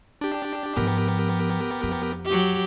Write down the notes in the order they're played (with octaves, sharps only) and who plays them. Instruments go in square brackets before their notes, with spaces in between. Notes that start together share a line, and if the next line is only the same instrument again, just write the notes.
[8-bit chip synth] D4 G4
[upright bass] G#2 F3 [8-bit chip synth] B3 G4 A#4
[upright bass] F2
[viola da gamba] F#3 G4